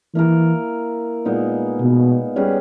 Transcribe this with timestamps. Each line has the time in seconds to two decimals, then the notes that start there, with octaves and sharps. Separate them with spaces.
0.14 E3 A#3 E4 A#4
1.25 A#2 G#3 B3 D#4
1.81 B2
2.36 G3 C#4 G#4 B4